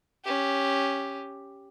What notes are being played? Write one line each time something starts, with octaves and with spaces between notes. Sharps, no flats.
C#4 G4